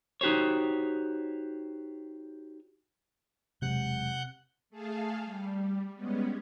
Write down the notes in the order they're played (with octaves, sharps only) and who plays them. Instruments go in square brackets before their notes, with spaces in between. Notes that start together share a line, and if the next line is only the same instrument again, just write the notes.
[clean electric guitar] D#4 F#4 G4 C5 C#5
[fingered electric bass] E1 F#3 G#3 [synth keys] C3 [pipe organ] F#5 F#6 G6
[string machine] A3 G#4 A4 F5
G3
G3 G#3 B3 C#4